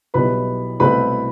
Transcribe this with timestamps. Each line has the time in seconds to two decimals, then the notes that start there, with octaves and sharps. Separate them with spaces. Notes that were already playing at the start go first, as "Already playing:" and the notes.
0.14 B1 B2 G3 B3 E4 B4 B5
0.80 C2 B2 A3 C4 E4 B4 B5